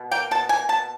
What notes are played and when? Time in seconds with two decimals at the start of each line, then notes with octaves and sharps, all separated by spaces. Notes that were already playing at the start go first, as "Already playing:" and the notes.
Already playing: B2
0.11 A#3 G5
0.31 B2 A5
0.49 A#3 G#5
0.69 B2 A5